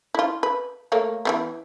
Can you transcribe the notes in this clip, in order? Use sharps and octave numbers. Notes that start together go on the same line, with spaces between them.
E4 F4
B4
A3 A#3 C#5
E3 G#3 B3